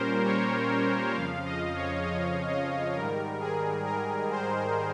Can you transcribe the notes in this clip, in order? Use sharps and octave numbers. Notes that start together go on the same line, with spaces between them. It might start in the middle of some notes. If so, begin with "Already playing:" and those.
Already playing: A#2 G3 C#4 A#4 C5
C#5
F2 C#3 F3 F5
D#5
C#5
D#5
D#5
G#2 D#3 G3 A#4
G#4
A#4
C5